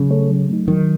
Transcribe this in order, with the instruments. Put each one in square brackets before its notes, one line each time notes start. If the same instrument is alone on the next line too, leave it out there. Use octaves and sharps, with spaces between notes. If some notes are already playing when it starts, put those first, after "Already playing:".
Already playing: [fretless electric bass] C#3 [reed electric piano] F#3
[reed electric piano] A3 C#4 A4 C#5
F#3
A3 D#4
[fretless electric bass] D#3 [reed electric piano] F#3